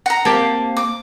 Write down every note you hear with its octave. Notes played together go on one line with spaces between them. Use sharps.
F#5 A#5
A#3 C4 G4 A5
D6